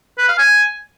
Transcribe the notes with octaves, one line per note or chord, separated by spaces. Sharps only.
B4
F5
G#5